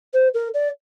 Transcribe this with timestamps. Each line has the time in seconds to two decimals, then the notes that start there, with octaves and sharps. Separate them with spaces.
0.14 C5
0.34 A#4
0.54 D5